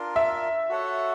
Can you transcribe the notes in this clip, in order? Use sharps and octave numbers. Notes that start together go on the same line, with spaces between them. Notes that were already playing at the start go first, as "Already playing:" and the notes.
Already playing: D4 F4 A#4
E5
F#4 A4 C#5 F#5